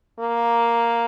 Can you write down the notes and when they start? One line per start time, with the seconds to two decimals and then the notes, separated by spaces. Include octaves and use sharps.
0.20 A#3